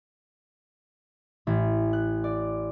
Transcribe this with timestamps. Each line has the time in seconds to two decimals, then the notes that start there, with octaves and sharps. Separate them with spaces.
1.47 A1
1.93 F#6
2.24 D5